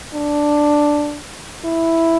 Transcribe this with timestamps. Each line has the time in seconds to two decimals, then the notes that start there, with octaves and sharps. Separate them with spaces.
0.14 D4
1.66 E4